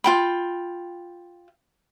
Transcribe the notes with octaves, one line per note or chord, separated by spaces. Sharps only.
F4 G5 B5